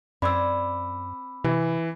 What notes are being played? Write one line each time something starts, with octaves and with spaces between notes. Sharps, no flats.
F#2 C4 D5 B5 D6 E6 G#6
C3 E3